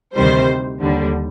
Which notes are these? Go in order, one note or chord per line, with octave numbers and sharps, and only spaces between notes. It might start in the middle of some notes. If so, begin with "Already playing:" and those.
D2 C3 D#3 G3 C5
D#2 D3 G3